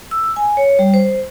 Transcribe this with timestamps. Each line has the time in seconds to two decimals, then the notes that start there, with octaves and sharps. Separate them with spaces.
0.11 E6
0.36 G#5
0.57 C#5
0.79 G3
0.94 C5